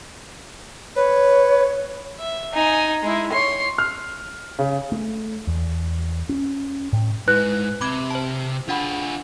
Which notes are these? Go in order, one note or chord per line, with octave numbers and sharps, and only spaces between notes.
B4 C#5
E5
D#4 G#5
G#3 E4
C#5 C6
F6
C#3
A3
E2
C#4
A2
G#2 E4 B4 F#6
C3 B5 D6 G#6
C5 A5
D4 F4 G#4 F#5 B5